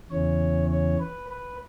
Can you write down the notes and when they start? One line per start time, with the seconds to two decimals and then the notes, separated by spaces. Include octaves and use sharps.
0.10 E2 C#3 E3 C#5
0.70 C#5
1.00 B4
1.29 B4